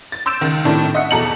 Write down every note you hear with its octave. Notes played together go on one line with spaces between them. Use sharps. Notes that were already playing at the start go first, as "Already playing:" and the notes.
A6
C6 E6 G6 D7 E7
C#2 D#3
A2 C3 D#3 D4 E4
D#5 E5 F#5
E2 B2 A4 A#5 C#7 F#7